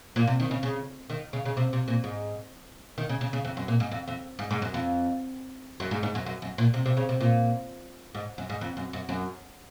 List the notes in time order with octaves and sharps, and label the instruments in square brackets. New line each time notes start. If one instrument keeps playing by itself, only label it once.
[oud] A#2
C3
D#3
C#3
C#3
D#3
C#3
C#3
C3
C3
A#2
G#2
D#3
C#3
C#3
C#3
F2
F#2
A#2
G#2
F2
F2
G#2
G#2
F#2
F2
F#2
G#2
G#2
F#2
F#2
F#2
A#2
C3
C3
C#3
C3
A#2
G#2
F#2
G#2
F2
F#2
F#2
F#2